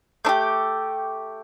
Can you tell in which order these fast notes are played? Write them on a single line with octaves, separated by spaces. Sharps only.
A3 D4 G4